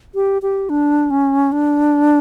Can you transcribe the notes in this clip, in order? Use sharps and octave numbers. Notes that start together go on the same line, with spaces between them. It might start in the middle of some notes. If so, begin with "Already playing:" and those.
G4
G4
D4
C#4
D4